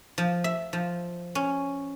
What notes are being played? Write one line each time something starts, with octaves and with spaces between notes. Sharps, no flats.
F3
E5
F3
C#4